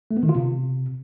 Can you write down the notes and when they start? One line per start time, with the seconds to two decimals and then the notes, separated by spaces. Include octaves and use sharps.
0.11 A3
0.17 B3
0.23 D#3
0.29 F4
0.35 C3